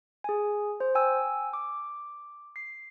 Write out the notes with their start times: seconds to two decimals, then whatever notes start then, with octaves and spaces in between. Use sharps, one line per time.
0.24 G#4 G#5
0.80 C5
0.95 G5 G#5 E6
1.53 D6
2.56 C7